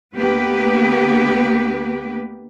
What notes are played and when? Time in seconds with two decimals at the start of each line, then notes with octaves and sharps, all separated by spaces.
0.16 D2 A#3 B3 G4 B4